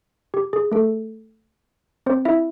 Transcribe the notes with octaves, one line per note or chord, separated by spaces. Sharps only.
G4
G#4
A3 A4
C4 C5
E4 E5